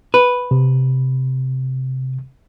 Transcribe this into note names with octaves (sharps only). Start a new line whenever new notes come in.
B4
C3